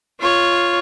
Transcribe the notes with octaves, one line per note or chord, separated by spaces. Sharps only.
F4 C#5